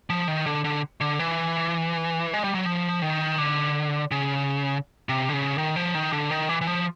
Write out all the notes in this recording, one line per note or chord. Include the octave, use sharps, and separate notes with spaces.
F3
D#3
D3
D3
D3
E3
G#3
G3
F#3
F3
D#3
D3
C#3
C3
D3
C#3
D#3
F3
D#3
D3
D#3
E3
E3
F3